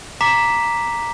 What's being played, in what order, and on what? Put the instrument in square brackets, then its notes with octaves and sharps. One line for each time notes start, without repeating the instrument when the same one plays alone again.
[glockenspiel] A#5 D6 B6 E7